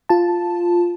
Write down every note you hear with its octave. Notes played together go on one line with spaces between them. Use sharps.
F4 A5